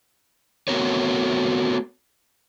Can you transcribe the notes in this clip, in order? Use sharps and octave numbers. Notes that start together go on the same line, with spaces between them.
A3 B3 C4 F#4 A#4 C#5